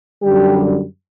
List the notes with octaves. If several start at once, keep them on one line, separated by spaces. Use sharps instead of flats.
F#2 D3 G3 G4